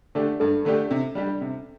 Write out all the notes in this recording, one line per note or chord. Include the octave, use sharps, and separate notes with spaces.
D3 A3 D4 G4
G2 A4
D3 A3 D4 G4
C3
G3 D4 G4
C3